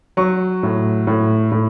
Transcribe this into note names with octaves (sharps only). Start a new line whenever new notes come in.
F#3 C#6
A2
A2
A2